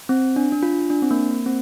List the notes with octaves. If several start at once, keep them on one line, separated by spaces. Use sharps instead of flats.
C4
D4
D4
F4
D4
C4
A#3
A#3
C4